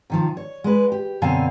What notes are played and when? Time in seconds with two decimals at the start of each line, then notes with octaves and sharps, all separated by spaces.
0.10 C3 D#3 F3
0.37 C#5
0.64 G#3 B4
0.92 G4
1.22 F#2 B2 D3 C4 F5 G#5